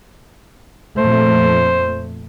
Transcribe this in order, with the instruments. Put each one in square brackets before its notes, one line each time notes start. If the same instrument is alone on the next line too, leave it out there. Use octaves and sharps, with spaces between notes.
[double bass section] F2 A#2 A3 [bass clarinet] C5